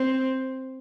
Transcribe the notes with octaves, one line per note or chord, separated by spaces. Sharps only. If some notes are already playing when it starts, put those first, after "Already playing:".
Already playing: C4